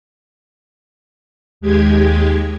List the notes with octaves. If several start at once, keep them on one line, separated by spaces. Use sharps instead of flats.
D#2 G#3 G4 G#6